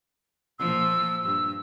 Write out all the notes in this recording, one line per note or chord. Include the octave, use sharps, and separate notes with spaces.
A#2 F3 E6
G2 E6